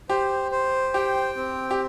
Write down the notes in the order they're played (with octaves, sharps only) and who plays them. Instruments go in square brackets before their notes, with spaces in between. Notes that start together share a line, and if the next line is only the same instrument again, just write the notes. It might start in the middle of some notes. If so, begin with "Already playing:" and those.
[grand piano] G4 [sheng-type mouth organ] C5
[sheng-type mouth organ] C5
[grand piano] G4 [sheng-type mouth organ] G5
[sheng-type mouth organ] C4
[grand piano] G4